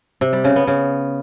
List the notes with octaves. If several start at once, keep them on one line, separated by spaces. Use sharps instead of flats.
C3
G3
C#3
B3
C#3